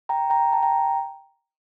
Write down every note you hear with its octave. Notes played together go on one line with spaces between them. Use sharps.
G5 A#5
G5 A#5
A5
G5 A#5